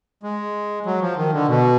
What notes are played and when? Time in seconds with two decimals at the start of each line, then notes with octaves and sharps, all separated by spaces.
0.23 G#3
0.86 F#3
1.01 F3
1.17 D#3
1.33 D3
1.48 B2